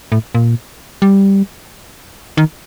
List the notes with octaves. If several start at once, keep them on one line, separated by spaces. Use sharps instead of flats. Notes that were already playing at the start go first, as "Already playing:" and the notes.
A2
A#2
G3
D#3